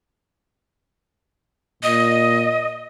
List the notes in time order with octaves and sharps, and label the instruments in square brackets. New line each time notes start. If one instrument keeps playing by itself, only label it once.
[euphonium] A#2 [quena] D#5